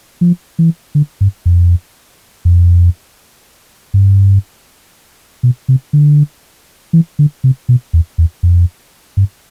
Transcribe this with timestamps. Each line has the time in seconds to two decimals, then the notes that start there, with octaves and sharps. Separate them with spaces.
0.21 F3
0.59 E3
0.95 D3
1.21 G2
1.46 F2
2.45 F2
3.94 G2
5.43 B2
5.68 C3
5.93 D3
6.93 E3
7.19 D3
7.44 C3
7.69 B2
7.93 E2
8.18 E2
8.43 F2
9.17 G2